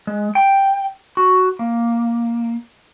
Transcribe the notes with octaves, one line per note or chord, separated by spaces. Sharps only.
G#3
G5
F#4
A#3